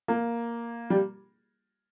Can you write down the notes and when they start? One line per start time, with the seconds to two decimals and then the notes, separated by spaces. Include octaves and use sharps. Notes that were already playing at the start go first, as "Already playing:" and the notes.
0.08 A#3
0.90 G3